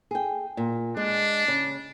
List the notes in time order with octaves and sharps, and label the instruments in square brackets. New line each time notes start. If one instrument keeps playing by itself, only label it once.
[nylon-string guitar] G#4 G5
A#2
[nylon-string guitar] G#3 [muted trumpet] D4
[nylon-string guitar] C#3